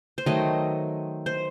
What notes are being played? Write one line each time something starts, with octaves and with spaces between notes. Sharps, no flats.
C5
D#3 F#3 A3 D#5
C5